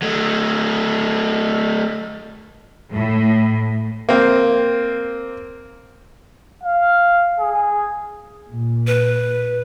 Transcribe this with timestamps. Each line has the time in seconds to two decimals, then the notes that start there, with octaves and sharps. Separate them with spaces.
0.02 F#3 A3
2.93 A2
4.09 A#3 C4
6.63 F5
7.40 G#4
8.49 A#2
8.87 B4